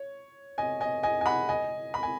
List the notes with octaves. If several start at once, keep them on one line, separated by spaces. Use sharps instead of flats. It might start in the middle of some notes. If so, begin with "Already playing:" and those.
Already playing: C#5
D#5 G#5
D#5 G#5
D#5 G#5
G#5
F#5 B5
D#5 G#5
B5
G#5